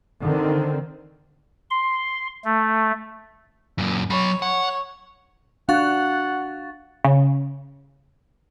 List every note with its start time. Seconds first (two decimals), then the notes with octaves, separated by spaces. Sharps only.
0.20 D3 D#3 C4
1.70 C6
2.45 A3
3.78 F#2 A#2
4.10 F#3 C#5 B5
4.42 C#5 F#5
5.69 D4 F#4 F5 F#5 A6
7.04 C#3